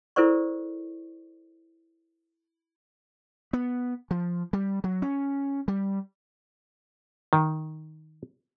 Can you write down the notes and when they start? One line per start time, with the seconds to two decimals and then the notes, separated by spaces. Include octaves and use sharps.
0.16 E4 A4 A#4 C5 D5 C#6
3.53 B3
4.11 F3
4.53 G3
4.84 F#3
5.02 C#4
5.68 G3
7.33 D#3